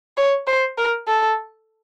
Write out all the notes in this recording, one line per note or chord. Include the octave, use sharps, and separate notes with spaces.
C#5
C5
A#4
A4